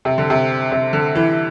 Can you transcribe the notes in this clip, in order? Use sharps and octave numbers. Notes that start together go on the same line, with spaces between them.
C3
D3
C3
C3
D3
E3